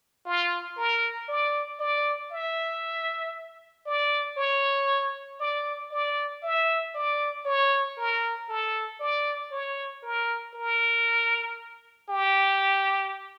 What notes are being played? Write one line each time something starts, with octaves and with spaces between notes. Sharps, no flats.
F4
A#4
D5
D5
E5
D5
C#5
D5
D5
E5
D5
C#5
A#4
A4
D5
C#5
A#4
A#4
G4